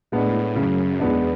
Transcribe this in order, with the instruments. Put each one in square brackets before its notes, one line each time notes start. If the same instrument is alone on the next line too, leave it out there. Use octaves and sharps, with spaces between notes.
[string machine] A2 [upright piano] G#3 B3 D4
[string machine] F#2 [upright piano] C#3
[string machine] E2 [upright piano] G#3 B3 D4